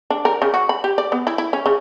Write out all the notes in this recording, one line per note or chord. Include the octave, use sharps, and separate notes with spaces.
D4
A#4
C#3
F#4
B5
G4
D5
B3
E4
E4
C#4
C#3